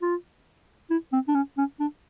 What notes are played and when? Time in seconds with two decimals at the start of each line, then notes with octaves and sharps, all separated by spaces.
0.02 F4
0.90 E4
1.12 C4
1.28 D4
1.35 C#4
1.57 C#4
1.80 D4